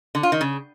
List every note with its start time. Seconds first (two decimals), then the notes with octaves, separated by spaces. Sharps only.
0.15 D3
0.23 F4
0.32 D#3
0.41 C#3